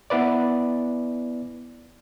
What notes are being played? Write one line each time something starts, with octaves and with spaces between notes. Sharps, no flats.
B3 E4 B4 D5